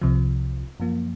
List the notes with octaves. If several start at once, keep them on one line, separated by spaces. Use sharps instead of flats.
C2 C3 F3
F#2 F3 A#3